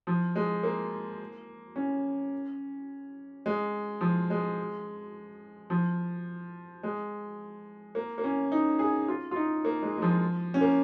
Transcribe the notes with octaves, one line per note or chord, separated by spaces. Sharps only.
F3
G#3
A#3
C#4
G#3
F3
G#3
F3
G#3
A#3
A#3
C#4
D#4
G#4
F4
F4
D#4
A#3
G#3
G#3
F3
C#4
A#3